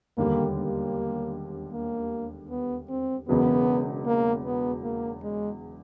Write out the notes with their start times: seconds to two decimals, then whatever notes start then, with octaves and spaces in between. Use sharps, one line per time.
0.17 E1 D#2 D3 G3 A#3
0.56 A#3
1.73 A#3
2.50 B3
2.89 C4
3.28 E1 E2 C#3 F#3 B3
4.06 A#3
4.45 B3
4.84 A#3
5.22 G#3